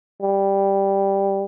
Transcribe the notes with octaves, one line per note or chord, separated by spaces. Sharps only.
G3